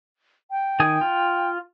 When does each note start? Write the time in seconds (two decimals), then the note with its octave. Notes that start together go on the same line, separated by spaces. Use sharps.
0.51 G5
0.80 D#3 G#5 D#6
1.01 F4